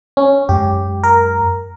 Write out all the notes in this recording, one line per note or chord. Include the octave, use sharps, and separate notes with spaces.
C#4
F#2 G#3 G4
A#4